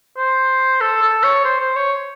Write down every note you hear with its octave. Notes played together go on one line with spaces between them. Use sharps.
C5
A4
A4
C#5
C5
C5
C#5